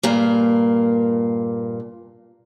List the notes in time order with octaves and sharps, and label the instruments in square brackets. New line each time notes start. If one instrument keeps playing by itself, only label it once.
[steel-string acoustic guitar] G2 A#2 A#3